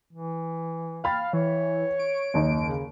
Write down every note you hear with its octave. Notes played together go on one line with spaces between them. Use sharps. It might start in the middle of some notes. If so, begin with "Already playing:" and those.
E3
F5 G5 B5 A6
E3 C#5
D7
F#1 D#2 D#4
C#3